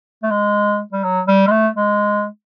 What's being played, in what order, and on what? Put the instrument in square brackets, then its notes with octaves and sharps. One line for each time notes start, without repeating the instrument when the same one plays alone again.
[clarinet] A3
G#3
G3
F#3
G3
G#3
A3
G#3